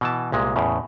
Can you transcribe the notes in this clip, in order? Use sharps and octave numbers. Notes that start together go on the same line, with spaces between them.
B2 E3 A5
C2 A#2 G#3
E2 A2 C#3